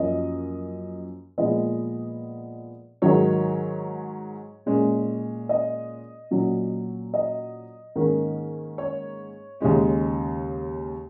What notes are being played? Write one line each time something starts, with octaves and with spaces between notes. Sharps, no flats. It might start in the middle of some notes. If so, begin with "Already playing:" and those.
Already playing: F#2 F3 A#3 C#4 D#5
A#2 F3 G#3 B3 D#5
G#2 D#3 F#3 C#5
A#2 G#3 C#4
D#5
A#2 F#3 C#4
D#5
G#2 D#3 A#3 C#4
C#5
D#2 C#3 G#3 C#4